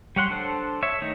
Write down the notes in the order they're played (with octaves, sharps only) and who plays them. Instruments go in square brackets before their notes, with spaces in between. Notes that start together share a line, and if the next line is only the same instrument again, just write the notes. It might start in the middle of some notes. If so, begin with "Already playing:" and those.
[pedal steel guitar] G3 C#5 F#5 C6
D4 A4 C5
C#5 E5
D#3 A3 D#4